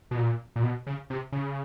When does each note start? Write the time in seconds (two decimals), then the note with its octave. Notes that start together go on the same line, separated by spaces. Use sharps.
0.11 B2
0.17 A#2
0.56 A#2
0.63 B2
0.87 C#3
1.10 C3
1.32 C#3